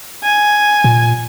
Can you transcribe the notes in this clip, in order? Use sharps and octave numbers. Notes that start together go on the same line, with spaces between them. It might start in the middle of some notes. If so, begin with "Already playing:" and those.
G#5
A#2